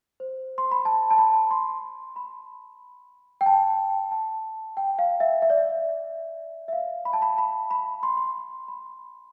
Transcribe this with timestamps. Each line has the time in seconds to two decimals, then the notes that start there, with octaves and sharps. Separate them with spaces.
0.20 C5
0.58 C6
0.72 B5
0.85 A5
1.11 A5
1.18 B5
1.51 C6
2.16 B5
3.41 G5
3.46 A5
4.11 A5
4.77 G5
4.99 F5
5.20 E5
5.42 E5
5.50 D5
5.57 E5
6.68 E5
6.73 F5
7.05 B5
7.13 A5
7.22 B5
7.38 B5
7.71 B5
8.03 C6
8.17 C6
8.68 B5